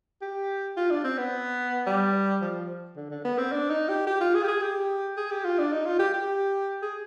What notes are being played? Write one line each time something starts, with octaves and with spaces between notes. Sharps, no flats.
G4
F4
D4
C4
B3
G3
F3
D3
D3
B3
C4
D4
D#4
G4
G4
F4
G#4
G4
G#4
G4
G#4
G4
F4
D4
D#4
F4
G4
G4
G#4